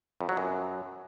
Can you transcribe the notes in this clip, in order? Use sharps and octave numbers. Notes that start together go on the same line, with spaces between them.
F2
F#3
F#2